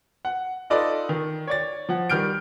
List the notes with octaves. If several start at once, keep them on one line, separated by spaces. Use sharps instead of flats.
F#5
D#4 F4 A4 B4 D5 D#5
D#3
C#5 D5 A6
F3 F#5
D#3 G3 F6 G6 D7